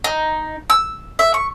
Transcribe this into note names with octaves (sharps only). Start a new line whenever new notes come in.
D#4
E6
E5
C#6